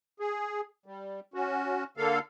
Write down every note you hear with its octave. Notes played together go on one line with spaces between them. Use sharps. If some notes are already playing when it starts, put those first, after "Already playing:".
G#4
G3
C#4 F#4
D3 A#3 A4 F5